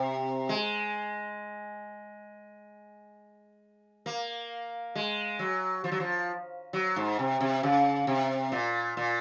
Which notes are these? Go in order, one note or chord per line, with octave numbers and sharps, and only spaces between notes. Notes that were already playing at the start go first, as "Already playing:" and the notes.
Already playing: C3
G#3
A#3
G#3
F#3
F3
F#3
F3
F#3
G#2
C3
C3
C#3
C3
A#2
A#2